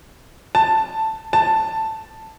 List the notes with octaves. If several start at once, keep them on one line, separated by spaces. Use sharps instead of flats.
A5
A5